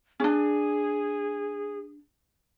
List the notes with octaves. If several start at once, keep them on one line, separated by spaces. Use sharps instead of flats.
C#4 D4 G#4